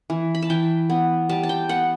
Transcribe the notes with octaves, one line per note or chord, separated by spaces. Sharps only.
E3
B5
A5
E3 G5
B3
G3 A5
A5
G5
B3 F#5